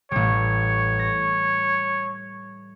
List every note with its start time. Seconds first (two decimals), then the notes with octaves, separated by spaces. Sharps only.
0.11 A1 G3 C#5
0.99 A#6